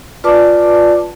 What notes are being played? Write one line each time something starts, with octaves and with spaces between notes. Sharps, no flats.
F4 B4 D5 A5 D6